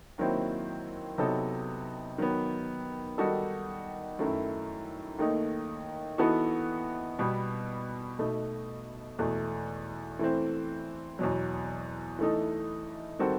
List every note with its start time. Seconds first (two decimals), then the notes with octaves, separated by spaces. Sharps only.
0.18 D#2 D#3 F#3 C4 E4
1.18 C3 F#3 B3 D#4 A4
2.18 D#3 F#3 B3
3.18 D#3 G3 D#4 F#4 A4
4.19 F#2 D#3 A3 E4
5.19 D#2 D#3 A3 D#4
6.18 E3 B3 D#4 F#4 A4
7.19 B2 G3 B3
8.19 B2 A3 D#4
9.19 E2 B2 A3
10.19 E3 A3 C4
11.19 E2 B2 F#3
12.19 E3 A3 D#4 A4
13.19 D#3 G3 C4 F#4 A4